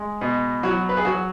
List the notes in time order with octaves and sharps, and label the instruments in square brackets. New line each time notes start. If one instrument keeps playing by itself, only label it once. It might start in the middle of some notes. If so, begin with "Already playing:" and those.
Already playing: [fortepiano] G#3
B2
F#3 F#4
B4
G#4
F#3 F#4